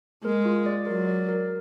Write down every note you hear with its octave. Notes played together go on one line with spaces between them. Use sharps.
G#3 A#4
F4
D5
F#3 A#4
D5
A#4